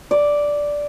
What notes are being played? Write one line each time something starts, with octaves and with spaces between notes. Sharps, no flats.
D5